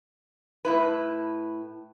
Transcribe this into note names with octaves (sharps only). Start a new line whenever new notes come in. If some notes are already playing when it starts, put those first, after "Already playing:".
A2 E4 B4